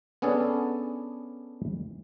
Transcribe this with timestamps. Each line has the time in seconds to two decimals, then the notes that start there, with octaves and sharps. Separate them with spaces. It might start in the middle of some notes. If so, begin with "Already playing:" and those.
0.22 B3 C#4 D4 G#4 A4